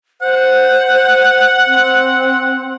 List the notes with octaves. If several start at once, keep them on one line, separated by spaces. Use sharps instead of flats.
C5 F#5
C4